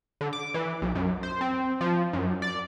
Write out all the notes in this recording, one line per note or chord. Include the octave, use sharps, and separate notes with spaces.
D3
D6
E3
B1
F#2
C5
C4
F3
F#2
D5